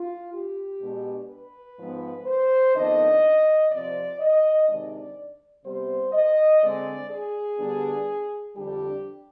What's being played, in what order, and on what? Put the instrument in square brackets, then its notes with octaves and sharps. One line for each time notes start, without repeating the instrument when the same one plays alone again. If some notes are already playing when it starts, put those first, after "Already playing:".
Already playing: [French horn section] F4
G4
B2 G#3 D4
B4
G#2 F3 B3
C5
F2 D#3 B3 D4 D#5
C3 F3 C4 D5
D#5
C3 D#3 G#3 D4 D5
C3 G3 B3 C5
D#5
D3 G#3 C4 D5
G#4
D3 G3 B3 D4
F2 D3 G3 D4 G4